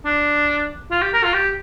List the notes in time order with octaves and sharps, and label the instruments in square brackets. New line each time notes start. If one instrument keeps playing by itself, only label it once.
[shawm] D4
F4
G4
A#4
F4
G4